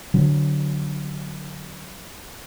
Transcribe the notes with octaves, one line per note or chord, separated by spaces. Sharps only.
D3 F#3